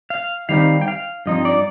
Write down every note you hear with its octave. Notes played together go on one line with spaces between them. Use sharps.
F5
D#3 G3 C4 D#4 F5
G5
F5
G2 F3 C4 D#4 D#5
D5